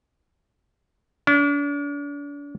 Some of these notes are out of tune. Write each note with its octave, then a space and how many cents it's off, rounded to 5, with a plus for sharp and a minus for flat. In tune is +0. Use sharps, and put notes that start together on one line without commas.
D4 -40